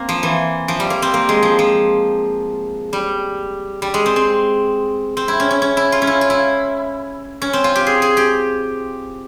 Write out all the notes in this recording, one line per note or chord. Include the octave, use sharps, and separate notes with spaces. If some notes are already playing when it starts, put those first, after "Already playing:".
Already playing: A#3 C4
F3
E3
F3
G3
A#3
C4
A#3
G#3
F3
F3
G3
G3
G#3
C4
C4
C4
E4
C#4
C#4
C#4
E4
F4
C#4
E4
F4
E4
C#4
C4
F4
G4
G#4
G#4
G4